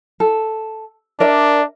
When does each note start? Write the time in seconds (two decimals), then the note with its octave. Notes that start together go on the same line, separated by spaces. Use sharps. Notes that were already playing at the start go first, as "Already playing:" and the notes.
0.20 A4
1.20 D4 A#4 D5 E5